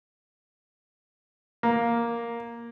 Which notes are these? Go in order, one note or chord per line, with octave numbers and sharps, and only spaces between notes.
A#3